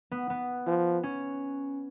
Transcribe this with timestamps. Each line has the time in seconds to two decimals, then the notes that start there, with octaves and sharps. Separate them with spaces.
0.11 B3
0.30 B3
0.67 F3
1.03 C#4